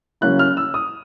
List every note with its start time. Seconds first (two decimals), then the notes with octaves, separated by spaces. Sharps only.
0.21 C#3 F#3 A#3 C#4 E4 F#6
0.39 F6
0.57 E6
0.74 D#6